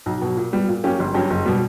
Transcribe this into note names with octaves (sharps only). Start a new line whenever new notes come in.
B1
B2 F#3
A#2
G3 B3
A#2
F#3 A#3 C#4 G4
G1
G2 F#3 C#4 G4
F#1
B2 G3